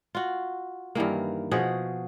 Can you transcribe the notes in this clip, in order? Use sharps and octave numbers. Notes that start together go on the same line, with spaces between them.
F4 F#4
G2 D#3 E3 A#3
B2 F3 F#4 G#4